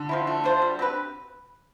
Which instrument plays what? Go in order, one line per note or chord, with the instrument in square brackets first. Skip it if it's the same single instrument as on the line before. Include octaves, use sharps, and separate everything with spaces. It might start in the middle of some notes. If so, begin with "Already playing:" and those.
Already playing: [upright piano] D3
[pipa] F3 C4 E4
A3
D4 F4 C5
G3
C4 G4 B4